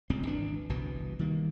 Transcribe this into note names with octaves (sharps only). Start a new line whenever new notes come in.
D1 C#2 C4
G#1 E3 D4
G1 C2 B2 E3
D#3 G3 A#3